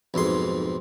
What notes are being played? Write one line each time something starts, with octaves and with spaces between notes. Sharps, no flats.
B1 F2 G#2 C6